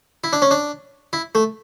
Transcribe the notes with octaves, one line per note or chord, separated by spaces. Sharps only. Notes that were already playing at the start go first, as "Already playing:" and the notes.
E4
D4
C#4
D4
E4
A3